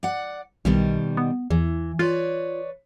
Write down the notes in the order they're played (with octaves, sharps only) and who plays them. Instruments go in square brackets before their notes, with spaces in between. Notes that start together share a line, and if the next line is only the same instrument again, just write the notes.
[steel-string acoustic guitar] D5 F#5
[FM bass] B1 [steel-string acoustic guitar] B2 D#3 G3
[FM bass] B3
[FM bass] E2 [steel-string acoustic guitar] E3
[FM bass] F4 [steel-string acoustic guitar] B4 C#5 D5